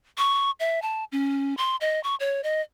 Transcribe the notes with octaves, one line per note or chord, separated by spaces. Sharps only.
C#6
E5
A5
C#4
C6
D#5
C#6
C#5
D#5